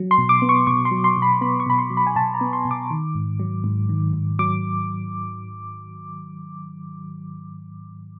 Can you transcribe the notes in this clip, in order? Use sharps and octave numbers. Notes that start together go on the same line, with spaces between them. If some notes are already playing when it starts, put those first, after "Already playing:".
Already playing: F#3
C6
B2
D6
B3
C#6
B2 C#6
C6
F#3
C6
B2
B5
B3 B5
C#6
B2 B5
C6
F#3
B5
G#5
B2 A5
A#5
B3
C6
B2
D6
D#3
G#2
F#3
G#2
D#3
G#2
F#3 D6